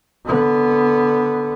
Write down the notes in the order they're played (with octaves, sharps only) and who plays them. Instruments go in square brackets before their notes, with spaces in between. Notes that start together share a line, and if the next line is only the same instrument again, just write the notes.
[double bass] D3 B3